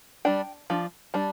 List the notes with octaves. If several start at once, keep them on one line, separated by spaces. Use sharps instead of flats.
G3 D4 G5
F3 D4
G3 D4 A5